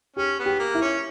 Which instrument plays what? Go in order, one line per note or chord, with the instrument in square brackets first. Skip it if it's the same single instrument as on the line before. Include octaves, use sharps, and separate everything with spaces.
[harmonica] C#4 [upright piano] G4
[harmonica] B3
[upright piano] G4
[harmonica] A#3
[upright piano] E4
[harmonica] C#4